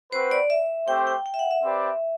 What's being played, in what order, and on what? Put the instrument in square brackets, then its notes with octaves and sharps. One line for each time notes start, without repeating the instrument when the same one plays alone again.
[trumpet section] C4 F#4 B4 [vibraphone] C5
[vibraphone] D5
E5
[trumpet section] A3 C4 G4 C5 [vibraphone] G5
[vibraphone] G5
G5
E5
F#5
E5
[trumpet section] C4 G4 B4 D5